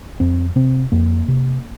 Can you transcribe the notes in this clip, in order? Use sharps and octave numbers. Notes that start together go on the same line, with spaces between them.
F2 C4
C3 C4
F2 A#3
C3